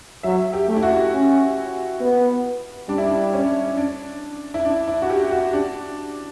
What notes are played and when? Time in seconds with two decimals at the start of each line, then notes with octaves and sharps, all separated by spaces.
0.23 F#3 E5
0.53 G4
0.68 A3
0.77 E4
0.83 F#4
1.12 C#4
2.00 B3
2.89 G3 D4
2.98 E4
3.06 D4
3.33 C#4
3.77 D4
4.54 E4
4.65 D4
4.88 E4
5.02 F#4
5.10 G4
5.31 F#4
5.53 D4